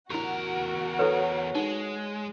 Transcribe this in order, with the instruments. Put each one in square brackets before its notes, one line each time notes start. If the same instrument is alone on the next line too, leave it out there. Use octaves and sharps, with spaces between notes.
[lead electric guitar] E2 A#4 [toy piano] E4 G4 [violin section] F#4 F#5
[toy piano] E4 A4 B4 [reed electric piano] C#5
[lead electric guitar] G#3 [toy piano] D#4